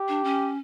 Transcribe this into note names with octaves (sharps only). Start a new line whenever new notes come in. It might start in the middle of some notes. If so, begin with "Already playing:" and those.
Already playing: G4
D4
C#4